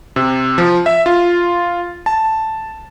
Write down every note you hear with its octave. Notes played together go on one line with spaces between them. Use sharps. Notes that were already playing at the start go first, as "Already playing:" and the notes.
C3
F3
E5
F4
A5